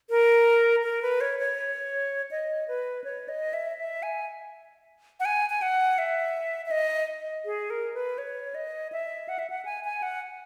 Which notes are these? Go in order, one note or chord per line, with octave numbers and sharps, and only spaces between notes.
A#4
A#4
B4
C#5
C#5
D#5
B4
C#5
D#5
E5
E5
G#5
F#5
G#5
G#5
F#5
E5
E5
D#5
G#4
A#4
B4
C#5
D#5
E5
F#5
E5
F#5
G#5
G#5
F#5